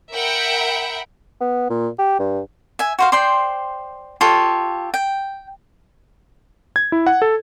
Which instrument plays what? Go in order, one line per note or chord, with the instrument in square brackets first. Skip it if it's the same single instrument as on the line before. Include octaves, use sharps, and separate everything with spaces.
[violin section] A#4 E5 F#5 G5 B5
[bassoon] B3
A#2
G4
G2
[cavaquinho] E5 G#5
F#4 C5 F5
C5 D5 G5 C6
F4 G4 A4 C#5
G5
[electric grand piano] G#6
E4
F#5
A4